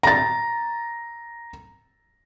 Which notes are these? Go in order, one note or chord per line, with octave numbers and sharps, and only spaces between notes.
A#5 A6